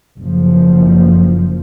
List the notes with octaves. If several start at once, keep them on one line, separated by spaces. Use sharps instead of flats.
F#1 F3